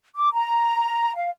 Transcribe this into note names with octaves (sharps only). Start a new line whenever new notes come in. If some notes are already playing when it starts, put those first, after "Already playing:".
D6
A#5
F5